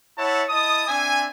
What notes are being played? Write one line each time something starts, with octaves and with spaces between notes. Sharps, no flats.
E4 C#5 E5 F#5 A5
E4 D#5 A5 D#6
C4 D4 E5 G#5